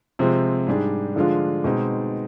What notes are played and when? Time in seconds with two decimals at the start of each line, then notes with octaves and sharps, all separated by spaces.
0.19 C3 F3 G#3 C4
0.67 G#2 G3 D4 G#4
1.16 D3 F3 G#3 D4 F4
1.64 B2 G#3 C4 D#4